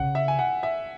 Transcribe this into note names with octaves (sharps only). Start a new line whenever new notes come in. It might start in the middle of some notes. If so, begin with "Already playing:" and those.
Already playing: C#3 F#5
E5
G#5
F#5
E5